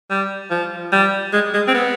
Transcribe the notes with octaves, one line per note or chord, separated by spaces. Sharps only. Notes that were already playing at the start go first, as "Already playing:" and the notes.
G3
F3
G3
G#3
G#3
C4
B3